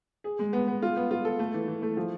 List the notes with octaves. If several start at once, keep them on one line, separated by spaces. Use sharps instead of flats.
G#4
G#3
B3
B3
F4
B3
F4
A4
A3
E3
E3
A3
F3